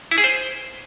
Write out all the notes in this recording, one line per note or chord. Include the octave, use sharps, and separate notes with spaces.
E4
G#4
C5